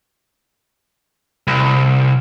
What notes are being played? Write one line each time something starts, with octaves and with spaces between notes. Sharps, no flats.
C2